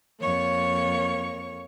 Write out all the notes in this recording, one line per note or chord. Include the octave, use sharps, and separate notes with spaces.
F2 A#3 C#5 C#6